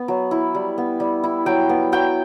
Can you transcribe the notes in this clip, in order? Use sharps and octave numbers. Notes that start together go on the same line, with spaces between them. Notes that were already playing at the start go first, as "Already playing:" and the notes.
Already playing: B3
F#3
E4
G3
B3
G3
E4
F#3 G5
B3
F#3 G5